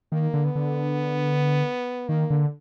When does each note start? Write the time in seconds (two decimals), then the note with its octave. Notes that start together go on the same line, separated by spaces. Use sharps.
0.12 D#3 A#3
0.34 D3
0.45 B3
0.56 D3
2.08 D#3 A#3
2.30 D3